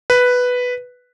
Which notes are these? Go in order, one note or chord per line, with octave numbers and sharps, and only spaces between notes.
B4